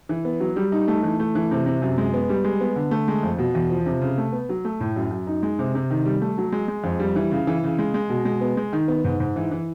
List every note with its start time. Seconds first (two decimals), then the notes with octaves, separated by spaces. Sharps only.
0.09 E3
0.25 B3
0.40 F#3
0.56 G3
0.72 D#4
0.88 A3
1.03 E3
1.20 A3
1.35 E3
1.51 C3
1.66 C3
1.82 F#2
1.98 G#3
2.14 B3
2.29 G3
2.44 G#3
2.61 B3
2.76 D3
2.91 A3
3.08 G#3
3.23 F2
3.38 B2
3.55 E2
3.70 F3
3.86 C3
4.01 C#3
4.18 A3
4.33 B3
4.49 F#3
4.65 A3
4.80 A2
4.96 F#2
5.11 F#2
5.27 D#4
5.43 G#3
5.59 C3
5.75 C3
5.90 D#3
6.06 G3
6.21 A3
6.38 F#3
6.52 G#3
6.68 G#3
6.84 F2
6.99 G3
7.16 E3
7.31 C#3
7.47 E3
7.63 C#3
7.79 G#3
7.94 G#3
8.10 B2
8.25 G#3
8.41 B3
8.57 G#3
8.73 D#3
8.88 B3
9.04 G#2
9.20 G#2
9.36 E3
9.51 E3